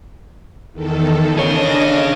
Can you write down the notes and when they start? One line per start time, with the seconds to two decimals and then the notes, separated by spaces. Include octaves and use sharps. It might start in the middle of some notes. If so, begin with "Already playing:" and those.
0.72 E2 D#3 A4
1.38 D4 G#4 C#5 D#5 A#6